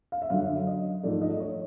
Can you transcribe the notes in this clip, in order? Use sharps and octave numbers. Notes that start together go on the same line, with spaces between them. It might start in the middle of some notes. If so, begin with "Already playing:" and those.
F5
E5
F#2 D3 F#3 F5
D#5
G#2 F3 A3 D5
D#5
C#5